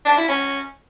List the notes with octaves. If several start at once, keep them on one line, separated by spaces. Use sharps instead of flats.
D4
E4
C#4